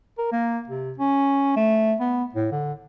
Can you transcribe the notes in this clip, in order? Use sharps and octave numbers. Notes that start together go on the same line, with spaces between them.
A#4
A#3
C3
C#4
A3
B3
A2
D3